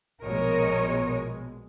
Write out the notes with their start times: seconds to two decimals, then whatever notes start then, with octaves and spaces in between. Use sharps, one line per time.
0.22 A#1 B2 G#3 A#4 C#5 D#5